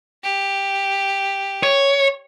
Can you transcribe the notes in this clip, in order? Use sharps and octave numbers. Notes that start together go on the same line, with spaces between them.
G4
C#5